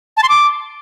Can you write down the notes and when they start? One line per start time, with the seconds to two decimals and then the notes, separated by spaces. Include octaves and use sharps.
0.17 A5
0.23 C6
0.29 D6